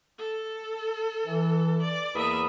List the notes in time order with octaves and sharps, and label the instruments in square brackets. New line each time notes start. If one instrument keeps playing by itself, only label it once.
[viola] A4
[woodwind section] E3
[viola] D5
[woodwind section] E2 B5 D#6 [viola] A#3 E5